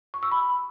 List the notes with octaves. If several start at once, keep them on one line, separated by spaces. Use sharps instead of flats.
C#6
E6
B5